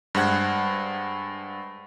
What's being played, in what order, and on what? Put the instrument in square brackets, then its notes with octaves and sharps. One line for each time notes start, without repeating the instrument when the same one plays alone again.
[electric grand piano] G2 G#3 C5 F#5 F#6 G#6